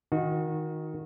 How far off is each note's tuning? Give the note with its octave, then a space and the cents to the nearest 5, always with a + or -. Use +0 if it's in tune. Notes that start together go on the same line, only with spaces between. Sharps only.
D#3 +10 F#4 -25